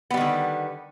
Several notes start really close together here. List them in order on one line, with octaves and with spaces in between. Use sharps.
B3 G3 D#3 D3